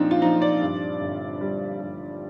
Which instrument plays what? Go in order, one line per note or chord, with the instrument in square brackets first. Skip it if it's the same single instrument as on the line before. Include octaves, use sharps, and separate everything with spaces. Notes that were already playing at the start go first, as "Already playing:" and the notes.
Already playing: [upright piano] A#1 A#2 F3 C4 D4 D#4
F4
F3 D#4
D5
G2
G1
G3
G2